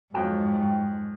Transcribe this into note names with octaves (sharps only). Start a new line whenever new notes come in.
F2 G#2 F#3 G5